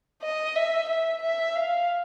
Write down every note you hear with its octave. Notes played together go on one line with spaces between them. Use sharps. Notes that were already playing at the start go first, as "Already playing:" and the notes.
D#5
E5
E5
E5
F5